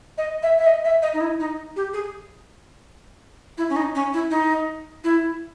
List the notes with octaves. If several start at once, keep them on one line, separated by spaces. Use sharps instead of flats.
D#5
E5
E5
D#5
E5
D#5
D#4
E4
D#4
G4
G#4
E4
C#4
D#4
C#4
E4
D#4
E4